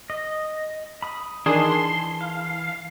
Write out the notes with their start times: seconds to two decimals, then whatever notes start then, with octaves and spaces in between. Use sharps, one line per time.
0.10 D#5
1.02 B5 D#6
1.46 D#3 E3 D4 G#4 A5 C6
2.21 F5